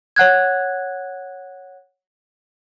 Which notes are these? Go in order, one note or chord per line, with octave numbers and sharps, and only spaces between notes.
C#5 F#5 F#6 G#6